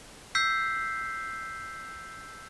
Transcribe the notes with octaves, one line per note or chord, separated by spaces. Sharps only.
E6 G6 B6 C7